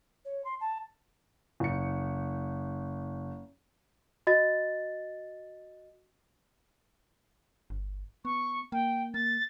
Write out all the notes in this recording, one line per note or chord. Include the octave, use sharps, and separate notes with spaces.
C#5
C6
A5
F#1 C#7
F#4 D#5 A6
G1
B3 C#6
A#3 G5
A#3 A6